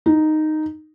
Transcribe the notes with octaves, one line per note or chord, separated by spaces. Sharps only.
D#4